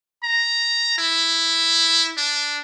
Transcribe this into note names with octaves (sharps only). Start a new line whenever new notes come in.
A#5
E4
D4